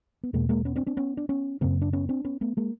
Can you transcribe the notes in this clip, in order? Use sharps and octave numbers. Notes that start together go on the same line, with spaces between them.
B3
E2 B2 G#3 A#3
G#3 A#3
B3 C#4
C4 D4
C4 D4
B3 C#4
D4
B3 C#4
F#2 C#3 A#3 C4
D4
B3 C#4
C4 D4
B3 C#4
A3 B3
G#3 A#3